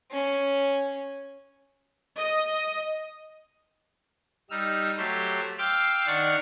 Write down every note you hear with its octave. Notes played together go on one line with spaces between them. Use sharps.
C#4
D#5
G3 D#4 E6 F6
F#3 A3 G4 C5
F5 G5 C6 D6 E6 F6
D#3 D4 D5 F#5 C#6 F6